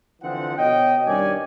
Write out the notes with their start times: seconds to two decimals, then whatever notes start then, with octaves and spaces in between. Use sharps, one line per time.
0.22 D3 E3 F3 C4 F#5
0.58 B2 C#5 D#5 G5
1.06 G2 D#3 C#4 D5 G#5